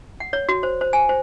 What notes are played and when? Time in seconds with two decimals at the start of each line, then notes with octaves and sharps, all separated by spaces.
0.20 F#5
0.33 C#5
0.49 F#4
0.63 C5
0.81 C5
0.93 G#5
1.09 C5